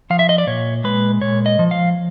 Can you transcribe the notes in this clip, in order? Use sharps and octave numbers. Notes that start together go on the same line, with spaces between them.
F3 F5
E5
D#5
D5
A#2 C#5
G#3 B4
A#2 C#5
D#5
F3
F5